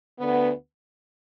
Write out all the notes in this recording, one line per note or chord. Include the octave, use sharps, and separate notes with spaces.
D2 D3 B3